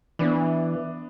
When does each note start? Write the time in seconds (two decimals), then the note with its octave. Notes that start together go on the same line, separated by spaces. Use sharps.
0.19 E3 B3 D4